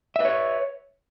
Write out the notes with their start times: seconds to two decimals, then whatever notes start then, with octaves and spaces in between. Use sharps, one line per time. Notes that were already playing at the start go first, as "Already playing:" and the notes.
0.16 E5
0.20 B4
0.25 C#5